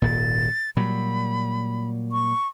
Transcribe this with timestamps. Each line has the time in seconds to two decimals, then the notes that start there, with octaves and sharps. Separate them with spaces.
0.02 D#1 G#1 A#2 A6
0.77 A#2 F#3 G3 B5
2.12 C#6